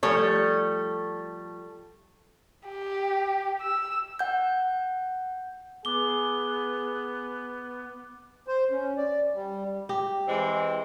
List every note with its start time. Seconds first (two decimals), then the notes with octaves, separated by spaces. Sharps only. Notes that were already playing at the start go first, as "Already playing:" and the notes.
0.03 F3 G3 A3 A4 C#5
2.68 G4
3.62 E6
4.19 F#5 G6
5.85 B3 G#4 D6 G7
8.48 C5
8.70 C#4
8.97 D5
9.34 G3
9.89 G4
10.28 E3 G#3 C4